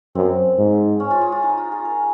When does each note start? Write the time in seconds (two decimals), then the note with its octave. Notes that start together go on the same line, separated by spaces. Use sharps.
0.15 F#2 C4
0.58 G#2
1.00 C#4
1.11 F4
1.21 G#4
1.32 F4
1.43 D#4
1.57 F4
1.72 G#4
1.85 A#4